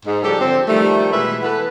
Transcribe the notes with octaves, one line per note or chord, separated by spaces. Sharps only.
G#2
C#3 F3 G3 D4 G4 A4
D3 F3 G3 C4
D#3 F3 G3 A3
B2 E3 G#3 A3 B4 E5
E3 B3 A4 B4